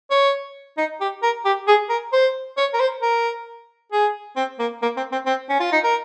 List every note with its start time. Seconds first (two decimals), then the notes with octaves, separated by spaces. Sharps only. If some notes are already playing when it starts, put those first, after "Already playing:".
0.11 C#5
0.78 D#4
1.01 G4
1.23 A#4
1.45 G4
1.68 G#4
1.89 A#4
2.13 C5
2.57 C#5
2.74 A#4
2.79 C5
3.02 A#4
3.92 G#4
4.36 C4
4.59 A#3
4.82 A#3
4.97 C4
5.12 C4
5.26 C4
5.49 C#4
5.60 F4
5.72 D#4
5.84 A#4